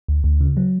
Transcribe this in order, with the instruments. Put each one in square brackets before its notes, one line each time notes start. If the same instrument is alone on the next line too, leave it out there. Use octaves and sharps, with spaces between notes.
[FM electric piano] D2
D2
C#3
F#3